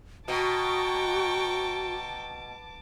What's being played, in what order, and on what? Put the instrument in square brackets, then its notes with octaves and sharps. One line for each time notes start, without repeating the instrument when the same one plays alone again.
[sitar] B2 [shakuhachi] F#4 [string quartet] G5 A#5 C#6 [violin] A5 D6